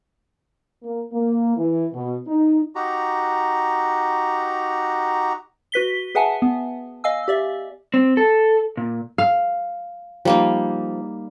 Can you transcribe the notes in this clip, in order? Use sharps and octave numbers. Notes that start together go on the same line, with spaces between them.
A#3
A#3
E3
B2
D#4
D#4 F#4 G4 A#5
F#4 B4 B6 G7
G#4 B4 E5 F#5 G#5 A5
B3
D#5 F5 G#5 E6
G4 D5 E5
C4
A4
A#2
F5
F3 G3 A#3 D#4